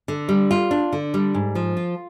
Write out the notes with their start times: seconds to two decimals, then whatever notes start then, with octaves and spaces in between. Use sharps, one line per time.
0.08 D3
0.29 G3
0.51 F4
0.71 D4
0.92 D3
1.14 G3
1.34 G#2
1.55 F3
1.77 F4